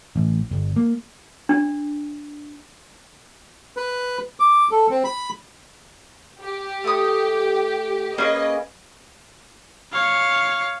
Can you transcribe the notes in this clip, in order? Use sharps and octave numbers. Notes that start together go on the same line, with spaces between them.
A1
G1
A#3
D4
B4
D6
A4
C4
B5
G4
A3 D#6
A#3 C#4 G#4 B4 D#5
C#5 F5